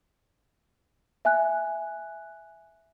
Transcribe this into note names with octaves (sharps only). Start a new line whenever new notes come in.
E5 G#5 F#6